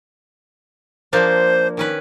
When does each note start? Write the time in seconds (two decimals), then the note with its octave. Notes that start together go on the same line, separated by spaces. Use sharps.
1.13 F3 A#3 D4 C5
1.77 D#3 C#4 B4